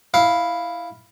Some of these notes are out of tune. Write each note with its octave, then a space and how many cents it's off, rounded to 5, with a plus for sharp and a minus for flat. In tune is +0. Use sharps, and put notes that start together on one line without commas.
E4 -5 F5 +0